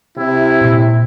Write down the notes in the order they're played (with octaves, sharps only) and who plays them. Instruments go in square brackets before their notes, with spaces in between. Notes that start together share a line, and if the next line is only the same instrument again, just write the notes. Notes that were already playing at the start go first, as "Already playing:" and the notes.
[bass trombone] C3 [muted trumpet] E4
[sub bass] A#2